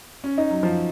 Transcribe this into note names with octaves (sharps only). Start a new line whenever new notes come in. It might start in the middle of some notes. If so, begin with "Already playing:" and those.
C#4
D#4
F#3
F3